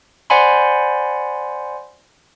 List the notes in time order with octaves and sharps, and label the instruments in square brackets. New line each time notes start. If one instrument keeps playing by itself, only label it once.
[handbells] C5 D5 F#5 G#5 B5 C6